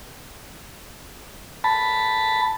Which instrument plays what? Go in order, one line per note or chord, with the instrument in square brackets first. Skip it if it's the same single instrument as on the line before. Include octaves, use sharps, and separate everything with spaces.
[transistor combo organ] A5 B5